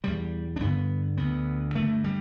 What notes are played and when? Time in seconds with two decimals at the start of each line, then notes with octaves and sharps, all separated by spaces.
0.04 E2 B2 G3
0.56 D4
0.61 G2 D3 B3
1.17 D2 D3 B3
1.75 G2 D3 A3
2.04 G3